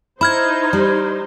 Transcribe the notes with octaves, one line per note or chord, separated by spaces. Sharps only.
D#4 E4 C5 B5 F6 G#6
G3